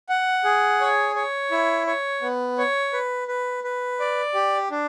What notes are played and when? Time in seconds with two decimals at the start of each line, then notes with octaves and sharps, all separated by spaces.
0.09 F#5
0.44 G#4
0.81 C#5
1.16 C#5
1.51 E4
1.87 C#5
2.22 B3
2.58 C#5
2.93 B4
3.28 B4
3.64 B4
4.00 D5
4.34 G4
4.71 D4